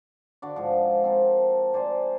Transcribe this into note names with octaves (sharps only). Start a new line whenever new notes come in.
D3 F#4 D5
G#2 F3
C4 A4 A#4
C5 D5 G#5 C6